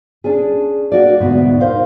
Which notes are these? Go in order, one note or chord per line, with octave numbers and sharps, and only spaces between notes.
C#4 D4 G#4
A#3 F#4 D5
D2 G#2 B2
A#4 C5 F5